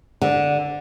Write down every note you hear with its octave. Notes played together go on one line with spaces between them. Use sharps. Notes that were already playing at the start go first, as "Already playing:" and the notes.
D3